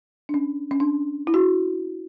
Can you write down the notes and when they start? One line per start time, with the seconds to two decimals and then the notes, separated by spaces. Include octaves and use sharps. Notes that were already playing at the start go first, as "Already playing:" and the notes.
0.29 D4
0.34 C#4
0.71 C#4
0.80 D4
1.27 E4
1.34 F#4